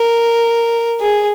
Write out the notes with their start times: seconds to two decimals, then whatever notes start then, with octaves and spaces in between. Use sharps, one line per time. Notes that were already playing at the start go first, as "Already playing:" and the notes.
Already playing: A#4
1.00 G#4